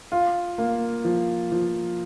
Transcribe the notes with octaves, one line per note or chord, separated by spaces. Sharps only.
F4
A#3
F3
F3